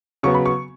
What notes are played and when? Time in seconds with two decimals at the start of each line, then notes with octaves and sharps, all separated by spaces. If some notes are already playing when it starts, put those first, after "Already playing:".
0.23 C#3 F#3 B3 C#6
0.34 B5
0.46 C#6